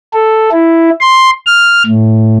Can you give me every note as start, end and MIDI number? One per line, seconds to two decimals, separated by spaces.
0.14 0.50 69
0.52 0.90 64
1.01 1.30 84
1.46 1.82 89
1.86 2.37 45